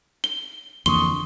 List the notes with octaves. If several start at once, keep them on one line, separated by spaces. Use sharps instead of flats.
G7
F2 D3 E3 A#3 C6 C#6 D#6 G7